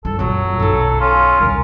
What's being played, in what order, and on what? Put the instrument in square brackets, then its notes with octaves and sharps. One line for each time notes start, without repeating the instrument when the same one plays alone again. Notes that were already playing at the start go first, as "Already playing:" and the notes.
[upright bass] F#1 G2 [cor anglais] A4
[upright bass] F#2 A#2 [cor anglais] F#3
[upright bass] B1 D#4 [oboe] A4
[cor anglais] C#4 [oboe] F4
[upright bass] D#1 C2 [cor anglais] A#4